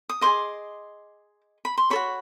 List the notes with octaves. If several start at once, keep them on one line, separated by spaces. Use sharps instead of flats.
D#6
G#4 C5 D#5 C6 D6
B5
C6
A4 C#5 B5 C#6
F#4